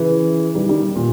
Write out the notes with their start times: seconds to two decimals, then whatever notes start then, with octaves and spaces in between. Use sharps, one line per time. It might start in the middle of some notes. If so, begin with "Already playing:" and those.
Already playing: C#3 E3
0.55 D#3 G3
0.69 D#3 G3
0.96 A#2